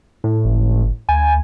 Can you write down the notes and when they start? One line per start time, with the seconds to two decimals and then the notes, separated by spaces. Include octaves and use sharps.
0.24 A2
0.45 G1
1.09 D2 G#5